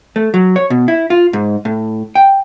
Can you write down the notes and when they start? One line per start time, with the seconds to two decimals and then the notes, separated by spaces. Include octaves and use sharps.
0.16 A3
0.34 F#3
0.56 C#5
0.70 B2
0.88 E4
1.10 F4
1.33 G#2
1.65 A2
2.15 G5